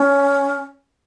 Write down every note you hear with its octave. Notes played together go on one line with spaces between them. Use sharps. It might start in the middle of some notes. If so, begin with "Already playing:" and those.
Already playing: C#4